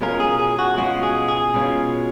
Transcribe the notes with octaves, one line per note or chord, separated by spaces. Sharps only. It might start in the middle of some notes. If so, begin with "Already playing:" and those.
B2 G#3 C#4 F4 A#4
G#4
G#4
F#4
B2 G#3 C#4 F4 F#4
G#4
G#4
B2 G#3 C#4 F4